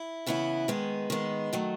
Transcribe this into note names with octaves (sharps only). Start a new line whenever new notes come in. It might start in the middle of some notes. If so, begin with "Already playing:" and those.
Already playing: E4
C#3 E3 B3 E4
D#3 G#3 B3
D#3 G#3 B3
D#3 F#3 A3